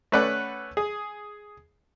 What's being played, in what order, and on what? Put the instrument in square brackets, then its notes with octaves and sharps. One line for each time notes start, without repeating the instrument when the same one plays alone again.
[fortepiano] A3 C#4 B4 D5 F#5
G#4